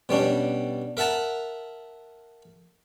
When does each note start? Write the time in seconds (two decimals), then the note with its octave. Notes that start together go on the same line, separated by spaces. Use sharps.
0.09 B2 G3 C#4 D4
0.97 A#4 E5 F#5 A5 A#5